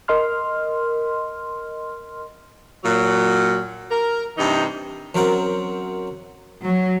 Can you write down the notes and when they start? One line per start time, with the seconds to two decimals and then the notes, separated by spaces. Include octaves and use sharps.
0.08 A#4 D#5 C6 F6
2.84 A#2 F#3
3.91 A#4
4.38 G2 C3 E3 D#4
5.15 F#2 F#3 C4 A#4 C5 F#5
6.63 F#3